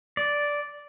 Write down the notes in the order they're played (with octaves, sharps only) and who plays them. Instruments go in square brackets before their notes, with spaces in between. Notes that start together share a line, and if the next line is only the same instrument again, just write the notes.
[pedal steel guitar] D5